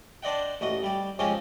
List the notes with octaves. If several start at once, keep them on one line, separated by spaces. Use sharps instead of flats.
D4 C5 D5 D#5 F#5 G5
A1 F#4 D#5
G3 G4
F3 G#3 C4 C#4 G4 D#5